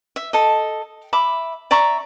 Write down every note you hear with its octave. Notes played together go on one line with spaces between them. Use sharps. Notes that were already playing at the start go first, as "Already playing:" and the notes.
E5
A4 D#5
E5 B5 D6
D5 E5 A#5 C#6